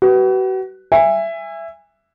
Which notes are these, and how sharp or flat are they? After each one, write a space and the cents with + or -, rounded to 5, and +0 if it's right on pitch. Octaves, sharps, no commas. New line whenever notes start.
F#4 +40 B4 +0
E5 +15 G#5 -25